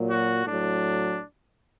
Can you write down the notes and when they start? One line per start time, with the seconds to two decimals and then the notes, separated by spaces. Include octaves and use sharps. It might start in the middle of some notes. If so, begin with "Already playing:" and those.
Already playing: A#2 F#3
0.10 F#4
0.46 A2 F#3 D4